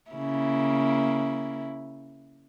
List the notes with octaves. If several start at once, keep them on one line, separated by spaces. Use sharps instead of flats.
C#3 A#3 E4